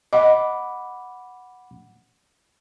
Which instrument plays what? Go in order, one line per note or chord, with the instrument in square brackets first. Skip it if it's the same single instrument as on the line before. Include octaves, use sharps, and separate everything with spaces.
[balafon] D#5 [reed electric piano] F#5 B5 D6